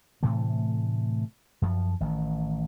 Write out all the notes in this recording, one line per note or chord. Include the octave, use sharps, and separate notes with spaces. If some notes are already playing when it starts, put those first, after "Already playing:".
A2 C3 E3 A3
F#2 F3
A1 D#3